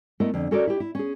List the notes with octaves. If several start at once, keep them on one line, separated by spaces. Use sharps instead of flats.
A3 B3 E4 A#4 D#5
F2 D3
C#4 F#4 A4 A#4 C#5 D5
E4 G4
E4
C#4 G#4